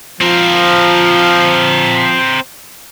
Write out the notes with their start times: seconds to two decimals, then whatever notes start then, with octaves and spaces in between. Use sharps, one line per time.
0.21 F3 C4 A#4